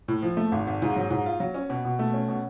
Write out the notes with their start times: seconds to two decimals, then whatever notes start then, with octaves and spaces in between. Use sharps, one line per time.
0.08 A2
0.22 F3
0.37 A3
0.52 G#1
0.67 G#1
0.82 G#2
0.96 F#3
1.11 G#2
1.26 F4
1.40 F#3
1.54 C#4
1.70 B2
1.85 B2
1.99 A3
2.14 C#4
2.28 B2